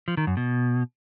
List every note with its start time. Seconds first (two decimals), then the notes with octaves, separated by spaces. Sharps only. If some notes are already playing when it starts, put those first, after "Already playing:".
0.08 F3
0.17 D#3
0.27 F#2
0.37 B2